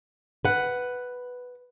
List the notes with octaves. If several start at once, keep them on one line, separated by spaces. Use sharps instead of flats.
B4 F#5